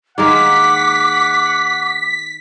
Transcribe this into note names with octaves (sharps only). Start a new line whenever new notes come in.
D#3 G#3 A#3 F#5 D6 B6